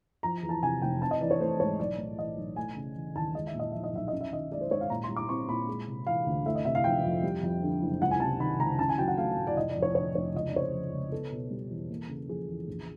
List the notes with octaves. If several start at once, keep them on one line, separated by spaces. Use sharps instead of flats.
F3 A#5
E2
A5
C3 G#5
F1 G5
C4 A5
D#5
E3 D5
C#5
A3 C5
G#2 C#5
B1 D5
A2
E3 D#5
B1
A3 G#5
C#3
E3
D#2 A5
G#3 D#5
E5
A#2
D#5
F3 E5
D#5
B1 E5
C#4 D#5
E5
D#3 D#5
G#3 D5
C5
G#2 C#5
F5
A#2 A#5
C6
G3
D6
C4 C#6
A#2 B5
G#3
C3
E3 F5
D2
A3 E5
D#5
C3 E5
F5
F3 G5
F2
G3
F2
D3
F#1
C#2 F#5
G#5
C3 A5
D#3 B5
C#2 A#5
C#4 A5
G#5
F#3 G5
F#5
A3 F5
A2
D5
F1 D#5
D5
F2
C#5
D3 C#5
F1 C#5
C#2 D#5
D5
C#3 C#5
C5
F3
C#2
B3 A4
B2
G3
E2
A#3
C#3
F3 G#4
E2
A#1